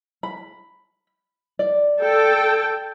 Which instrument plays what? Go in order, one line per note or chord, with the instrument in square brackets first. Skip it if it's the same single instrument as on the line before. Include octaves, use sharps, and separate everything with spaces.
[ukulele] B5
D5
[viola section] A4 G5